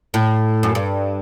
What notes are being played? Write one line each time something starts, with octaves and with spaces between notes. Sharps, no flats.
A2
F#2
G2